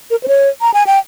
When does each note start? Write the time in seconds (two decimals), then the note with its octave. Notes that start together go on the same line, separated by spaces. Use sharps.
0.11 A#4
0.23 C5
0.28 C#5
0.61 A#5
0.74 G#5
0.87 G5